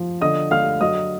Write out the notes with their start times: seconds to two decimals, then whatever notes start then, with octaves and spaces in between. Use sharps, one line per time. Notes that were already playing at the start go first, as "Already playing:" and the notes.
Already playing: F3
0.21 D3 D#5 D#6
0.51 D3 F5 F6
0.81 F#3 D#5 D#6